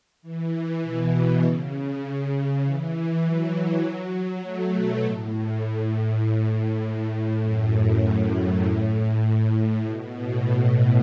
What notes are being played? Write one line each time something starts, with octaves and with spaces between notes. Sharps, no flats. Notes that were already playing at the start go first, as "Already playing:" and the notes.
E3
B2
C#3
E3
F#3
A3
B2
A2
F#2
A2
B2
A2
A2